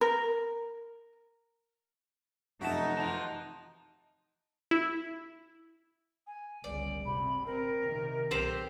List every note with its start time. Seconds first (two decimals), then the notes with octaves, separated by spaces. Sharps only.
0.01 A#4
2.61 F1 F#2 D#4 E4 F#4 E5 A5
2.97 B2 E3 F3 A5 A#5
4.71 E4
6.27 G#5
6.64 G1 C#2 D5
7.05 C3 B5
7.46 C4 A#4
7.84 C3 D#3
8.31 B1 C4 G4 C5